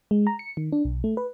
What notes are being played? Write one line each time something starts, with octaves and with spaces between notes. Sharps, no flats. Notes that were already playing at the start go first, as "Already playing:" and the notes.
G#3
A#5
C#7
D#3
D4
B1
A3
B4